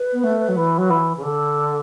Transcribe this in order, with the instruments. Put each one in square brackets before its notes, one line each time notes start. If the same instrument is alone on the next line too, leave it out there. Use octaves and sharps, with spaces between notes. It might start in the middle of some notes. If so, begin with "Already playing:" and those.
Already playing: [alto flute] B4
[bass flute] B3
A3
F#3
E3
F#3
E3
C#3
D3